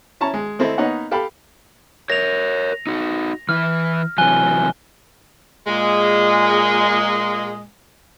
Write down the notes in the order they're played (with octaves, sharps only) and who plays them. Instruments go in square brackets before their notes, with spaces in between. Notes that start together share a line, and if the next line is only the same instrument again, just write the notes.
[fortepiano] C#4 E4 A5 A#5 C#6
G#3
A3 C4 E4 A4 D#5
A#3 B3 D#4 C#5 D#5 F#5
G4 A4 F5 G5 B5
[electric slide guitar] A#4 C#5 [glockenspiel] A#6 F7
[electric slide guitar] D#4 F#4
[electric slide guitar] E3 E4 [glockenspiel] F6
[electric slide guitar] C3 E3 F#3 [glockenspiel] G#5 F#6 G7
[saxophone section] A#2 G#3